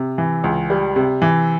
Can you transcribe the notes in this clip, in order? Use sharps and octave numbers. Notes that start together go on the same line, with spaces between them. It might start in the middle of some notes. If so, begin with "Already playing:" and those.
Already playing: C3
E3
C#2
G3
C3
E3